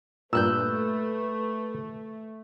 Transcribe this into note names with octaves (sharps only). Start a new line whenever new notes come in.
G2 A#2 A3 B4 E6 F#6 G6